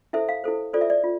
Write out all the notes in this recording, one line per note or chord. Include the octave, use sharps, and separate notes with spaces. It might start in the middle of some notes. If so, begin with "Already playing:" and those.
E4 A4 C5 E5
F5
E4 A4 C5
F4 A4 C5 D5
E5
D5
F4